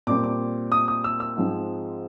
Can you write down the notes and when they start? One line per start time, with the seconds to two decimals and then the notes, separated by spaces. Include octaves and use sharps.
0.07 A#2 G3 C4 D6
0.24 D6
0.72 D#6
0.88 D#6
1.04 E6
1.20 E6
1.36 G#2 F3 G#3 C4